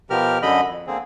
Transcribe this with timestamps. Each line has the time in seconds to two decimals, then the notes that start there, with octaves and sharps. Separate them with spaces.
0.10 B2 F3 G4 A#4 F6
0.42 F#2 D3 D#5 B5
0.69 F2
0.87 D3 A#3 C4 G#4